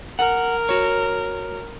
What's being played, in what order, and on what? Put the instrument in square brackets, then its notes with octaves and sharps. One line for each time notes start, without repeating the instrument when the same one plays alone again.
[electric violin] A#4 [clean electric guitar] F#5
[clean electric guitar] F#4 C#5